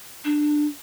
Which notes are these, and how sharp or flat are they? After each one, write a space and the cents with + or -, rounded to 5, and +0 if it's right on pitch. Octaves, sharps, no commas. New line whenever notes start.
D4 +15